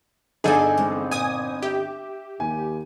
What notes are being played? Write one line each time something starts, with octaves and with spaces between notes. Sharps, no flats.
G1 D#4 G#4 A4 D5 D#5 G#5
E2 G#3 C4
A#2 G#5 D#6
G4 E5
D#2 G#5